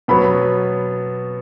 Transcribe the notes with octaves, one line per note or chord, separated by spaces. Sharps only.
B2 F#3 B3 B5